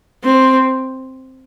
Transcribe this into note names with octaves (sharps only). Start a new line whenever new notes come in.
C4